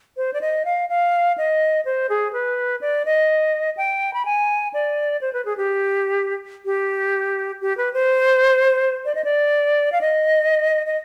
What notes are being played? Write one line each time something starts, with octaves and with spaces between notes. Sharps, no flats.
C5
D5
D#5
F5
F5
D#5
C5
G#4
B4
D5
D#5
G5
B5
G#5
D5
C5
B4
G#4
G4
G4
G4
B4
C5
D5
D#5
D5
F5
D#5
D#5